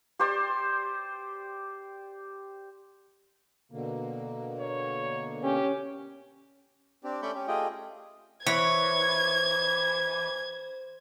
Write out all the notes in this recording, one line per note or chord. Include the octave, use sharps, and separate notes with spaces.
G4 C5 D5
B2 D3 A#3
C#5
C#4 G4
C4 D4 G4
A3 C#4 D5 B5 C#6 G6
C#4 G4
A3 F4 G4 G#4 D#5 G5
E3 C5 C#5 G#6